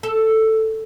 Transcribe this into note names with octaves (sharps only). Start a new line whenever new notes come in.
A4